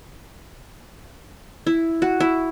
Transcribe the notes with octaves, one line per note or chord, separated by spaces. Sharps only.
E4
F#4
E4